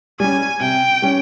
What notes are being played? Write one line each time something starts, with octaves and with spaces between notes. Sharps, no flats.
G3 C#4 G#5
C3 G5
G3 C#4